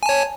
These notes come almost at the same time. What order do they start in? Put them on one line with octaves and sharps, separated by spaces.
G#5 A5 C#5